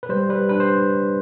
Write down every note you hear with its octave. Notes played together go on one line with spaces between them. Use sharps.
B4
G3 C5
G3 B4
D4 B4
C5